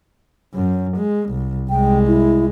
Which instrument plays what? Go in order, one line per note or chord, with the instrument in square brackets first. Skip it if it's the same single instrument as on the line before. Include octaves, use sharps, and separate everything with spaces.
[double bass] F#2
G#3
C2
[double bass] C2 G#3 [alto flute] G5
[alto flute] E4